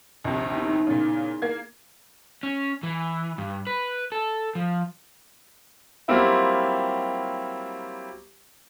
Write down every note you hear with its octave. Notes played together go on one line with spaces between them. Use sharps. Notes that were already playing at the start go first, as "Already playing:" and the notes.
A#1 D#2 C3
B3 D#4 E4
A#2 C#3 G#4 D5
A#3 G#6
C#4
E3
G2
B4
A4
F3
F#3 G3 A#3 C4 E4 F4